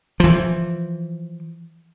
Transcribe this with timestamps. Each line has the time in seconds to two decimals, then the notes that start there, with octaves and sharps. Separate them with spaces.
0.20 E3 F3